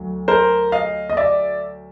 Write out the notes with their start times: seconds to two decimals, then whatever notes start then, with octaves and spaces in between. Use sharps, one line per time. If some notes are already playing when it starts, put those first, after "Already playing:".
Already playing: D2 F#3
0.28 A#4 C5
0.72 D#5 F5
1.10 D#5
1.17 D5 E5